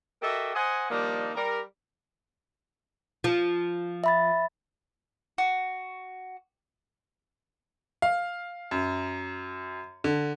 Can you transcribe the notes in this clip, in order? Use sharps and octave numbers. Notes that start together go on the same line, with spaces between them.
F#4 G4 A4 A#4 D#5 E5
C5 D#5 F#5 G#5
D#3 F3 G3 A#3 D4 D#4
G3 A#4
F3
E5 B5 A6
F#4
F5
F#2
D3